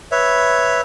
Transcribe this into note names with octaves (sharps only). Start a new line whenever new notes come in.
B4 C#5 E5